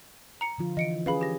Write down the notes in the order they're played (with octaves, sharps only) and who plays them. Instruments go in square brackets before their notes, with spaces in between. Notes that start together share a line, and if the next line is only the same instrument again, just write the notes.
[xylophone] A#5 C#7
[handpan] D3 F3 F4
[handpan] E3 [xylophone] D#5 C#7 D7
[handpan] C#4 G#4 [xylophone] B4 F5 B5
[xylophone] G4 A#6